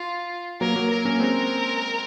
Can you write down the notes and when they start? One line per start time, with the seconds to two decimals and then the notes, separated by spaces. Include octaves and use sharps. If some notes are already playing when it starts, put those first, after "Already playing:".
Already playing: F4
0.61 F#3 A#3 A#4
0.76 F#3 A#3
0.91 A#4
1.05 A#3 C#4
1.20 G#3 C4